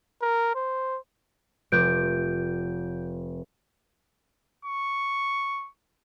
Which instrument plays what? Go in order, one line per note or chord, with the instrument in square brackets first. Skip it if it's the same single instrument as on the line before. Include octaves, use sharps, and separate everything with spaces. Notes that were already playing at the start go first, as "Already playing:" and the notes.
[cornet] A#4
C5
[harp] F1 [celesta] F#6 G6 D7
[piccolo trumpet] C#6